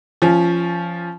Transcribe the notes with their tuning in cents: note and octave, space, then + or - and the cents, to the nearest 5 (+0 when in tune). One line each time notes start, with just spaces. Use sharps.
F3 -15 C#4 +0